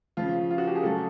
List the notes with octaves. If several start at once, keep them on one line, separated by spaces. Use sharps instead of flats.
C#3 F3 F4
F4
F#4
G4
G#4
C#3 F#3 A4